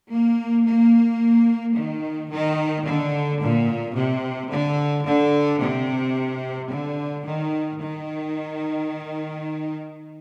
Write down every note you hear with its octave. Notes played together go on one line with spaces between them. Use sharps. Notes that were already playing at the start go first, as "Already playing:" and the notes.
A#3
A#3
D#3
D#3
D3
A#2
C3
D3
D3
C3
D3
D#3
D#3